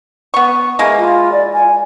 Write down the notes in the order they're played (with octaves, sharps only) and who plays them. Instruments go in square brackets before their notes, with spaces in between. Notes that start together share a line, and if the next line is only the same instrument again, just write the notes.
[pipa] B3 C#6
E3 G#3 A#3
[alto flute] F4
D5
G#5